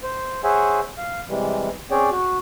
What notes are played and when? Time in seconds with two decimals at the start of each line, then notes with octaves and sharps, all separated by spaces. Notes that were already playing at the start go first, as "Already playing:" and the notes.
0.03 C5
0.44 G#4 C5 C#5 E5 F#5 G#5
0.98 F5
1.29 C3 E3 G3 G#3
1.91 C4 C#4 G#4 C#5 D5 G5
2.11 F#4